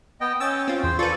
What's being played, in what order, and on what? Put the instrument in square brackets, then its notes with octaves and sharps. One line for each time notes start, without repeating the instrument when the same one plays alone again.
[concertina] B3 D#5 G5
[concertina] C#4 G5 [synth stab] E6 A6
[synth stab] C4 F4
[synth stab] E2 [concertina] C5
[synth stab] F4 B4 [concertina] A4 D5 C#6